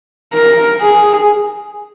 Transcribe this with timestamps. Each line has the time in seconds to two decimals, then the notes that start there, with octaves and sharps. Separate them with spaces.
0.34 A#4
0.82 G#4